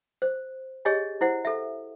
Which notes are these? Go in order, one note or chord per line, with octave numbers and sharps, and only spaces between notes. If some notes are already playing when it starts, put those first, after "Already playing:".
C5
G4 G#4 C#5 D#5 G#5
E4 C5 F#5
A4 E5